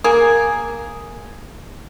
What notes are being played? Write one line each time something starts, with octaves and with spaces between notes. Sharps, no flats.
A#3 G#4